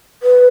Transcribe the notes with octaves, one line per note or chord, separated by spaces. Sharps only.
B4